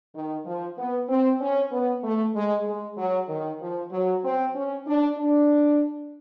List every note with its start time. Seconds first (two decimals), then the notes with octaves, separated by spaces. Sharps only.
0.14 D#3
0.45 F3
0.77 B3
1.09 C4
1.41 C#4
1.71 B3
2.03 A3
2.34 G#3
2.66 G#3
2.97 F#3
3.29 D#3
3.60 F3
3.91 F#3
4.23 C4
4.55 C#4
4.87 D4
5.18 D4